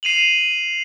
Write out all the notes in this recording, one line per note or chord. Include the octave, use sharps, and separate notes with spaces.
C7 D#7 F7 F#7